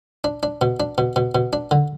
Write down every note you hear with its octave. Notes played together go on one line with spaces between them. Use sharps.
D4
D4
B2
D4
B2
B2
B2
D4
D3